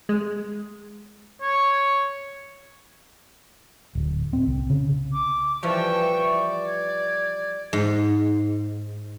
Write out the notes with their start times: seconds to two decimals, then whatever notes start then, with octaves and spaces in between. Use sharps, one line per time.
0.09 G#3
1.41 C#5
3.95 D1
4.33 C4
4.47 C2
4.70 C#3
5.13 D6
5.63 E3 F3 G3 E5 G5 C#6
6.26 D5
6.68 G#6
7.73 G#2